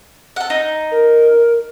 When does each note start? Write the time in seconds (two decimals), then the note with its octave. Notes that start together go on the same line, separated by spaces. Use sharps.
0.36 A4 F#5
0.50 D#4
0.91 A#4